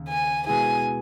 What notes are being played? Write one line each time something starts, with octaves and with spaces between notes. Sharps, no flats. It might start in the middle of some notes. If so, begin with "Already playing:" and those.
Already playing: D#2 C#3
G#5
B2 G#3 B3 E4 G#4 G#5